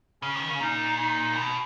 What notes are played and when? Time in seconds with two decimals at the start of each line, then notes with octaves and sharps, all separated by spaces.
0.22 C#3 C#4
0.36 D#3
0.48 C#3
0.60 A#2 D#4
0.98 D#4
1.36 B2